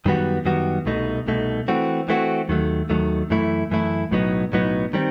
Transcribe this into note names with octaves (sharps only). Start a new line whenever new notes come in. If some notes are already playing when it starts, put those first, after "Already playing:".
F#2 D#3 G3 B3 F#4
F#2 D#3 G3 B3 F#4
C2 B2 A3 D#4
C2 B2 A3 D#4
E3 A3 C4 F#4
E3 A3 C4 F#4
D#2 D#3 F#3 A3
D#2 D#3 F#3 A3
F#2 E3 A3 E4
F#2 E3 A3 E4
B1 A2 F#3 B3 D#4
B1 A2 F#3 B3 D#4
D#3 G3 C4